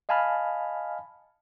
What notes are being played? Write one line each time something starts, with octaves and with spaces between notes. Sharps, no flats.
D#5 F5 G#5 A5 B5 F6